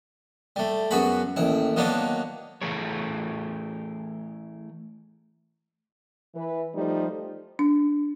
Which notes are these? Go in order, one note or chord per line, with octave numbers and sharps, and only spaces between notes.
G3 A3
F#2 B3 F#4 G#4 B5
A1 D#2 E4
D#3 F#3 A#3 B3 D4 D#4
E3 A3 G#4 A#4 C#5
E3 B4
F3 G3 A3 D#4
D4